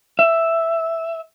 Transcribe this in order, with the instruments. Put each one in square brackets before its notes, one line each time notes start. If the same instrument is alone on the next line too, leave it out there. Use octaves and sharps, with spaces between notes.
[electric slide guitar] E5